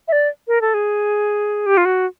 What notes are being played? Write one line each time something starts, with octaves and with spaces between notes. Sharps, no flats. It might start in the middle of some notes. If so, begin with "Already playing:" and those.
E5
D5
A#4
A4
G#4
G4
F4
F#4